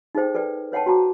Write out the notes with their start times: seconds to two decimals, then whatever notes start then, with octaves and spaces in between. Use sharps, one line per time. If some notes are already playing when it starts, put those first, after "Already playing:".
0.15 D#4 G#4 A4 C5 G5
0.35 A4 B4 D5 G5
0.72 B4 C#5 F#5 G5 A5
0.86 F#4 A5 A#5 D6